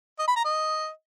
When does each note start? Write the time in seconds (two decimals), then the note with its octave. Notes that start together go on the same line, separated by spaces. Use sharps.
0.19 D#5
0.28 B5
0.36 A#5
0.45 D#5